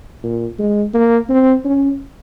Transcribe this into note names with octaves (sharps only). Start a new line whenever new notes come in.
A#2
G#3
A#3
C4
C#4